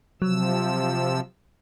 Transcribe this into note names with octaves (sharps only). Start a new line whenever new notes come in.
C3 F3 F#3 E6